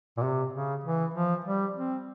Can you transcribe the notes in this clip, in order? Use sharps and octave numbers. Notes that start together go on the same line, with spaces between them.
A#2
C3
C#3
E3
F3
G3
C4